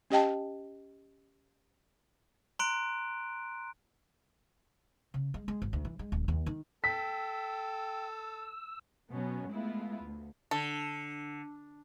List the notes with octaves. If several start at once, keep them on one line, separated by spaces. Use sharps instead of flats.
C#4 G4 D#5 G5 A5
A#5 C6 F#6 D7
C#3
G#3
G#3
G#1
D2
E3
G#3
D1
D#2
D#3
A4 G5 E6 B6
B2 F#3 B3 C#4
G#3 A3 B3 E4 F4
D2
D3 A4